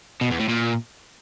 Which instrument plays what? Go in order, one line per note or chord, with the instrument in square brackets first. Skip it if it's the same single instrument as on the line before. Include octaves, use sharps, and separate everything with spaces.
[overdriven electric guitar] B2
E2
A2
A#2